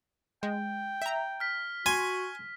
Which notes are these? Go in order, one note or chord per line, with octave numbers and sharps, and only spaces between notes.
G#3 G5
E5 A#5
F6 B6
F#4 G#5 C6